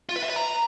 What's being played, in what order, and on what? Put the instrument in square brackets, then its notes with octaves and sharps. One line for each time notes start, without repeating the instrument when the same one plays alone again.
[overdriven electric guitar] F4
B4
E5
B4
A#5